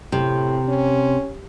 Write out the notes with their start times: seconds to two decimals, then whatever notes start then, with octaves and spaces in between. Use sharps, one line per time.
0.12 A2 C3
0.69 C#4